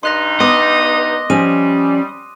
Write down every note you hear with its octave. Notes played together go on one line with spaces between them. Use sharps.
G2 D#4 C6 F#6 A#6
B3 D#5 C6 D6 D#6
F3 G3 C#4 G#5 D#7